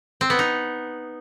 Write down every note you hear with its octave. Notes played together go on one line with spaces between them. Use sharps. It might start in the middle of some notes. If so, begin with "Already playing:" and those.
C4
B3
D#4